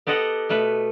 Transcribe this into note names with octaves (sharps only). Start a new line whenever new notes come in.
B3 G4 A4 D#5 F#5
B2 A3 B4